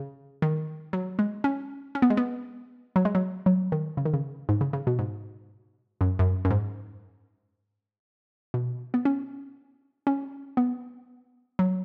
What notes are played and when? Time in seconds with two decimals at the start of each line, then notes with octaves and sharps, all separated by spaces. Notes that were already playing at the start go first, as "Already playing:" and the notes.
Already playing: C#3
0.42 D#3
0.93 F#3
1.19 G#3
1.44 C#4
1.95 C#4
2.02 B3
2.10 G#3
2.17 B3
2.96 F#3
3.05 G#3
3.15 F#3
3.46 F#3
3.72 D#3
3.97 C#3
4.05 D#3
4.13 C#3
4.49 G#2
4.61 C#3
4.73 C#3
4.87 B2
4.99 G#2
6.01 F#2
6.19 F#2
6.45 F#2
6.51 G#2
8.54 B2
8.94 B3
9.05 C#4
10.07 C#4
10.57 B3
11.59 F#3